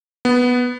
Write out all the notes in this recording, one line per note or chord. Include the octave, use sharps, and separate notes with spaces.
B3